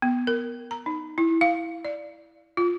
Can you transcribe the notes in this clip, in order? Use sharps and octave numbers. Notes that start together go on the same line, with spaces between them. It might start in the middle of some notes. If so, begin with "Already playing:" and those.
B3
A#4
A#5
D#4
E4
F5
D5
F4